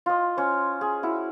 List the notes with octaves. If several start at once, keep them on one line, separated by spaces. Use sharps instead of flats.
F4 D#5
C#4 C5
G#4
E4 F#4